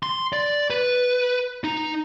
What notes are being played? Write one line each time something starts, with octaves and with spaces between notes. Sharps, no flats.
C6
D5
B4
D#4